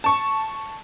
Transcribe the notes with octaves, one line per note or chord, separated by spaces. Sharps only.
A5 C#6